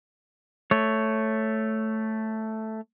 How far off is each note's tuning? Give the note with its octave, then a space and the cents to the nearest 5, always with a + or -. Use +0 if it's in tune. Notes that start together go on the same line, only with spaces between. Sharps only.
A3 +0 C#5 +0